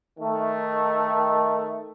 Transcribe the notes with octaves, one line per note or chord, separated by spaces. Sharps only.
D#3 A3